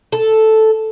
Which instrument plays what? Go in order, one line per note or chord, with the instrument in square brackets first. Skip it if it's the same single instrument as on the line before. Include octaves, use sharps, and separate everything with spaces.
[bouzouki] A4